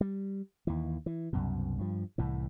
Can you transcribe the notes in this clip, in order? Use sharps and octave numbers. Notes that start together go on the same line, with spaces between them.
G3
D#2 E3
E3
C2 F#2 B2
G2 F3
C2 A2 E3